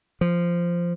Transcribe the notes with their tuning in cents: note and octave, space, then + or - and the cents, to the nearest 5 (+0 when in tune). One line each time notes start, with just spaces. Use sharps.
F3 -10